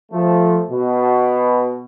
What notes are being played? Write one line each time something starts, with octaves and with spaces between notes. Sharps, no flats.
F3 A3
B2